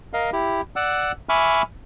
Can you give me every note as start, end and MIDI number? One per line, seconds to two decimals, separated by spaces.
0.13 0.30 70
0.13 0.30 75
0.13 0.30 77
0.33 0.61 64
0.33 0.61 67
0.76 1.12 74
0.76 1.12 78
0.76 1.12 88
1.29 1.62 76
1.29 1.62 80
1.29 1.62 83
1.29 1.62 85
1.29 1.62 86
1.29 1.62 89